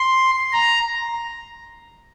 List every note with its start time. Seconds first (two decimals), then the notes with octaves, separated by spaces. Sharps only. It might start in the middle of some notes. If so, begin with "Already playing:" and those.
Already playing: C6
0.53 A#5